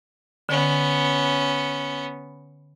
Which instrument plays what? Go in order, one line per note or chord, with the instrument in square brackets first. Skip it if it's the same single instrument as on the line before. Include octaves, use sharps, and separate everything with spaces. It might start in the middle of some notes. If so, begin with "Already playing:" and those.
[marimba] D3 [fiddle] B3 C#4